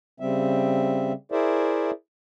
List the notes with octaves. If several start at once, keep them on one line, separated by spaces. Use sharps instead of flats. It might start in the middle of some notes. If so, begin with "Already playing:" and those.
C#3 G3 C4 E5
E4 G#4 A#4 C5 D5 E5